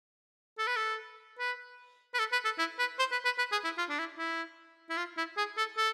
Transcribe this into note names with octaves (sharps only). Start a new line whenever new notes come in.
A4
B4
A4
B4
B4
A4
B4
A4
E4
B4
C5
B4
B4
B4
G#4
E4
F4
D4
E4
E4
E4
F4
E4
G#4
A4
A4